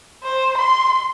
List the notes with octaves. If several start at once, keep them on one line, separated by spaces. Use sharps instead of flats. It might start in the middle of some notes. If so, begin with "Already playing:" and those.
C5
C6